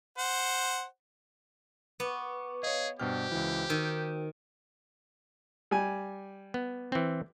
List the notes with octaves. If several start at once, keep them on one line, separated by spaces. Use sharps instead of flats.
C5 F#5
B3 C#6 D6
G#4 C#5 D#5 F5
G2 B2 F#4 G4 C5 G5 F6
C#2 E3
D#3 E6
G3 G#5
B3
E3 C4